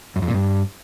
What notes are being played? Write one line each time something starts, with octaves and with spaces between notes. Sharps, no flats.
F#2
F2
A#2
G2